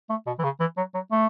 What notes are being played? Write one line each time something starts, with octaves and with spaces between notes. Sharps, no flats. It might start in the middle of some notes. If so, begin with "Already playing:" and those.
A3
B2
E3
C#3
E3
F#3
F#3
A3